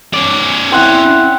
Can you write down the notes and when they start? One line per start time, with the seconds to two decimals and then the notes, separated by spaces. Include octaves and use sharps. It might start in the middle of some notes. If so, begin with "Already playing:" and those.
0.13 C#4 D5
0.72 C4 E4 F#5